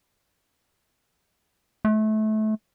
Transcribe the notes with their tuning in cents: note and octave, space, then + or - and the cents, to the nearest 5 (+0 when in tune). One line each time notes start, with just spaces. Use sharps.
A3 -25